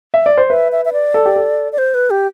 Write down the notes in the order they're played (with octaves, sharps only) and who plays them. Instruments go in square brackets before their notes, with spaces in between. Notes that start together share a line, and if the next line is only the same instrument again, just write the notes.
[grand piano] E5
D5
C5
[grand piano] B4 [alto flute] E5
[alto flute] E5
E5
D5
[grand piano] A4
G4
A4
[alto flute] D5
C5
B4
G4